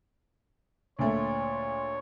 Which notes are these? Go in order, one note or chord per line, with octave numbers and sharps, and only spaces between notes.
D2 A#2 A3 C#5